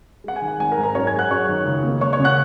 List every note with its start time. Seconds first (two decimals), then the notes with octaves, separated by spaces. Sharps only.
0.24 G#3 F#5
0.36 G#5
0.42 D#3
0.48 F#5
0.59 G#1 G#5
0.72 A#4 A#5
0.77 G#2
0.83 A#4 A#5
0.95 F#2 C#5 C#6
1.07 G#5 G#6
1.13 G#3
1.19 F#5 F#6
1.30 F#2 C#5 C#6
1.48 D#3
1.66 C#2
1.83 A#3
2.01 C#2 C#5 C#6
2.13 C#5 C#6
2.19 C#3
2.24 F#5 F#6